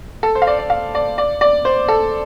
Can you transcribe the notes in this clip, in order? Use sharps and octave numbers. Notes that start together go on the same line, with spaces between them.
A4
C5
F5
D5
D5
F5
D5
D5
D5
C5
A4